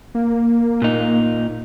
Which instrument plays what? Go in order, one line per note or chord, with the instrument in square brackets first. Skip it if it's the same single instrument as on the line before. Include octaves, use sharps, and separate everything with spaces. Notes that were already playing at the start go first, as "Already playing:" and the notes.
[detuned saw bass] A#3
[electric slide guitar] A#2 D#4